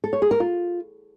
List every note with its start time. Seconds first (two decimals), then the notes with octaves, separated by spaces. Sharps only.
0.04 A4
0.13 C#5
0.22 G#4
0.31 A#4
0.40 F4